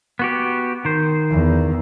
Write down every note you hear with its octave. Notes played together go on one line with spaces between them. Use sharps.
B3 F#4 G4
D#3 C5
E2